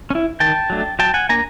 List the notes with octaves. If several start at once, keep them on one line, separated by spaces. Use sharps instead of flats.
C#4
E4
D#3 G5 A5
F#3 A3 D4
F#3 G5 A5
F#5 G#5
A#3 D4 G#5 A#5